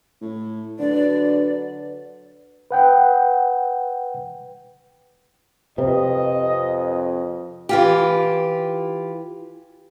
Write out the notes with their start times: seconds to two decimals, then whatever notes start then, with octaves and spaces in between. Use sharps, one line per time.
0.21 A2
0.79 D3 F#3 F#4 B4 D5
2.71 B4 F#5 G5
5.78 F2 C3 B4 D#5
7.69 E3 F4 G4